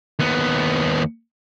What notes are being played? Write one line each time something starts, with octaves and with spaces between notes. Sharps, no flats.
D#2 B3